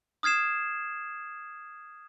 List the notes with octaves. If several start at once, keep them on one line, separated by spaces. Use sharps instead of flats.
D#6 F6 G#6 C7 E7